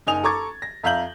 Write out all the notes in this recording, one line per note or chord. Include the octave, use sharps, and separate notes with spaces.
F#1 D#4 G#5 D#6 F7
A4 A#5 C#6 D6 G#6 A6
A#6
F2 E5 F5 A#5 G6 F#7